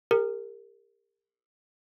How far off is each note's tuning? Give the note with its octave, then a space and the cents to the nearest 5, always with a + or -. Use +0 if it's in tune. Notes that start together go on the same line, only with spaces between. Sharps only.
G4 +40 A#4 -15